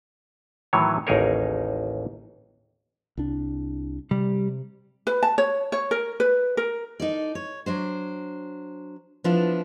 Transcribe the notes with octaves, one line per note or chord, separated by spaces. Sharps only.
A2 D#3 E3 F#3 C#5
A1 D#2 D#4 G#4 A#4 C#5
C2 D4
C3 G3
B4
A5
C#5
C#5
A#4
B4
A#4
D#4 A4 D5
C#5
F#3 D4 C5
F3 B3 D4 E4 F4